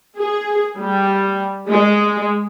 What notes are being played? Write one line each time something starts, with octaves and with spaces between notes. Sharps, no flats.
G#4
G3
G#3